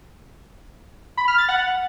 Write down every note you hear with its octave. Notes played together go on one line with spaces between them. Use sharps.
B5
F6
A6
F#5